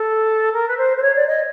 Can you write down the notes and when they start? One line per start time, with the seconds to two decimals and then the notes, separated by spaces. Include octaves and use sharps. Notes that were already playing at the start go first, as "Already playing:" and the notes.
Already playing: A4
0.52 A#4
0.68 B4
0.77 C5
0.97 C5
1.02 C#5
1.15 D5
1.27 D#5